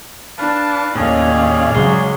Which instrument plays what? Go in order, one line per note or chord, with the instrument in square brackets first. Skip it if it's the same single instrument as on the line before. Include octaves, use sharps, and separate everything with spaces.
[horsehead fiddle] D4 [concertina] B4 F5 A5
[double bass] D#2 [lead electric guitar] A2 [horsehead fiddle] C#4 F5 [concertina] G#4 C#5 D5
[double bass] C#3 F#3 [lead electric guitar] G#3